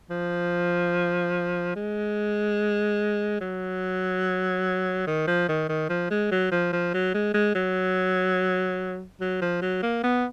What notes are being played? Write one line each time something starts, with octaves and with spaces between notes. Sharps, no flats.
F3
G#3
F#3
D#3
F3
D#3
D#3
F3
G#3
F#3
F3
F3
F#3
G#3
G#3
F#3
F#3
F3
F#3
A#3
B3